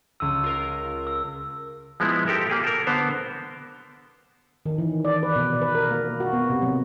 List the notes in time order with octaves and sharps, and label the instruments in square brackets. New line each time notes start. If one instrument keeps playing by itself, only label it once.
[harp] C#2 D#7 [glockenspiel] E6
[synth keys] F4 A#4
[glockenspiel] E6
[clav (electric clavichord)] F3 G#3 B3 E4
G4 A4 A#4 E5
A#3 G4 G#4
A4 A#4
D3 B3 C5
[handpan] D#3
E3
D5
B4
B2
B4
A#4
A#3
F#4
B3
C3
F#3